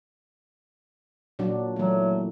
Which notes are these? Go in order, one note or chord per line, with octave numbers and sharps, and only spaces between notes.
A#2 F#3 D4
E3 F#3 A3